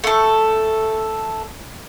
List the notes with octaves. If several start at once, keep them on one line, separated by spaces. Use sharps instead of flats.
A3 A4